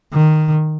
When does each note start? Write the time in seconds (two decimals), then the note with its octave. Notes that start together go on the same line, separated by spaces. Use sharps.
0.13 D#3